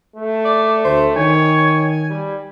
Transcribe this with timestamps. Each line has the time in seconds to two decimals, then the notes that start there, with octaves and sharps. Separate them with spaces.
0.16 A3
0.45 D5
0.84 D2 C5
1.16 D#3 C#5 G#5
2.10 G3